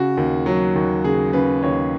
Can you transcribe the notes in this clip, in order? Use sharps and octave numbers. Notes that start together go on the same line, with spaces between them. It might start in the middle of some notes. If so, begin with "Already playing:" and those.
Already playing: C#3 F#4
D#2
F#3
D#2
C#3 G#4
C#3 B4
D#2 C#5